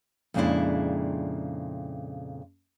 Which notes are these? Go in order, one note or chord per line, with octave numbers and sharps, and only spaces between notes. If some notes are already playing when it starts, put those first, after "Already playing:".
F2 A#2 C#3 G#3 D4 E4